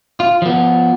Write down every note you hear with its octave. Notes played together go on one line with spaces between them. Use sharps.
F4
F3 B3